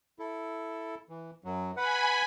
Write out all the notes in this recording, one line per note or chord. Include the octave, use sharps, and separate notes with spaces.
E4 A4
E3
F#2 F#3
B4 F#5 G#5 B5